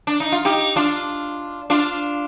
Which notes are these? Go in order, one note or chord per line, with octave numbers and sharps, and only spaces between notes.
D4
D#4
F4
D#4 G4
D4 F4
D4 F4